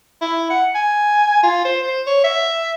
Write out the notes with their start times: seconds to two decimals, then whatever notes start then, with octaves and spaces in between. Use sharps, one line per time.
0.21 E4
0.50 F#5
0.75 G#5
1.43 F4
1.65 C5
1.83 C5
2.06 C#5
2.24 E5